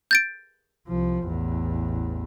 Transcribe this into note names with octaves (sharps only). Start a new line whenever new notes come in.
G6 A6 D7
C2 F3
A1 E2